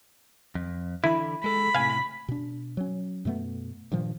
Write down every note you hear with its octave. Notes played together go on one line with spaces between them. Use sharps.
F2
D3 E3 E4 B5
G#3 A4 B5
A2 C3 F5 G#5
B2 D4
F#3 C#4
F#2 B2 A3 B3
G2 A#2 D#3 F3